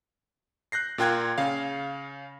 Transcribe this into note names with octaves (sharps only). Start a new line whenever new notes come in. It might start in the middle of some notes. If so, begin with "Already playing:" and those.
F#6 G6 A#6 C7
A#2 F4 A#4 G5 F#6 G#6
C#3 F5